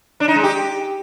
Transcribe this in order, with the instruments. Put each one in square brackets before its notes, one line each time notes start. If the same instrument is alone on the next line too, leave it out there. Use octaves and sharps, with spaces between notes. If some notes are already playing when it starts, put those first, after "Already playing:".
[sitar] D4
D#4
G#3
G4